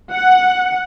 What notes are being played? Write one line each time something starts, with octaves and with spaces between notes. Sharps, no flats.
F#5